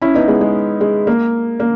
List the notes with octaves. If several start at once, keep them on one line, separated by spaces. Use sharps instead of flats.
C#4 E4
B3 D#4
G#3 B3
G#3
G#3
A#3
A#3